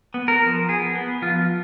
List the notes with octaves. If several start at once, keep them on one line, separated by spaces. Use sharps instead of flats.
B3
A#4
F3
B3 G#4
B3
F3 F4